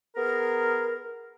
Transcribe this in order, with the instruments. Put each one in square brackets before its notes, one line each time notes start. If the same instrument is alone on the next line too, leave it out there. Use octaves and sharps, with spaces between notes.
[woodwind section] B3 G#4 A#4